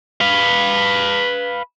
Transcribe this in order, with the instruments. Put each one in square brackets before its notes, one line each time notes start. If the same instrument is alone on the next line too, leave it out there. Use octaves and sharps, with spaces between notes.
[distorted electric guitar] B4 F5